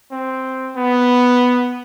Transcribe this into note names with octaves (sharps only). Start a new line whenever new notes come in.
C4
B3